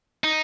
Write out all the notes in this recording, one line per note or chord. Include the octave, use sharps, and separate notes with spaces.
D#4